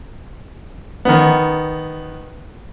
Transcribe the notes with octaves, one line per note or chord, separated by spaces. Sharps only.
D#3 B3